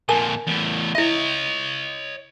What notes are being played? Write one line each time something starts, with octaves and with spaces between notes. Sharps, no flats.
F2 A#2 A#4 G#5 A5
E2 A2
E4 C#5 D#5 E5